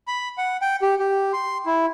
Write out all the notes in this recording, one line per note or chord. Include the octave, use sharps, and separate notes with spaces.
B5
F#5
G5
G4
G4
C6
E4